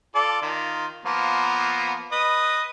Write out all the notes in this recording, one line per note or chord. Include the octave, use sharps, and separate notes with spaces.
F4 A4 D5
D#3 F4
F3 A#3 B3
B4 D#5